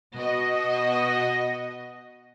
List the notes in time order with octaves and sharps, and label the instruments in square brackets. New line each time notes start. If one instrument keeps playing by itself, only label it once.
[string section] B2 F#4 D#5